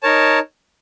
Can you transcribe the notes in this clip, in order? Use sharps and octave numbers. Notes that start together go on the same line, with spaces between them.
D#4 A#4 C#5 A5